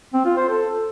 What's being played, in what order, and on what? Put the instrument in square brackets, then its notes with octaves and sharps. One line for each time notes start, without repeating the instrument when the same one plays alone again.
[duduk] C4
F4
C5
A4